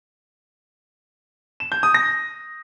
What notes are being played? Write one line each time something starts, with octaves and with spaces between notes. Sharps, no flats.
E7
G6
D#6
A#6